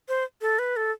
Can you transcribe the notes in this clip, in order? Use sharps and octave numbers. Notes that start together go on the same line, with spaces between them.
C5
A4
B4
A4